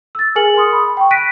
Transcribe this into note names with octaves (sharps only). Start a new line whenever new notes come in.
E6 A6
G#4 A#4 G#5 F6 C#7 F#7
C6 D#6
B5
G5 C#6
F#6 A#6 B6 D7 D#7